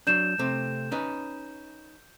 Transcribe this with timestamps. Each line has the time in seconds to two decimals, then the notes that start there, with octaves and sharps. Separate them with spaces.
0.07 F#3 D4 G6 E7
0.39 C3 A3 C4
0.91 C#4 D#4 B4